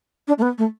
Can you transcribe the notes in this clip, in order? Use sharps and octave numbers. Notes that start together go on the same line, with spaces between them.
D4
A3
B3
A3